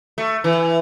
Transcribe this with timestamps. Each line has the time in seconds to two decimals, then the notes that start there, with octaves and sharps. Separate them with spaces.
0.18 A3
0.44 E3